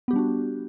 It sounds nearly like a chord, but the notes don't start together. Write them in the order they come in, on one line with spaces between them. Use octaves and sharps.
B3 G4 G3 D4 F#4